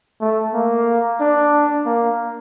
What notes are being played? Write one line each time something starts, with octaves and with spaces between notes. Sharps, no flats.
A3
A#3
D4
A#3